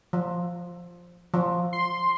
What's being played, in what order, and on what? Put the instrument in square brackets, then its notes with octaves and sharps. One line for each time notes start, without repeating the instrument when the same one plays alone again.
[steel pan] F3
F3
[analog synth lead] C6